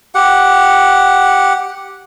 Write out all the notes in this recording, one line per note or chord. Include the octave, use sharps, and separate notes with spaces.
G4 F#5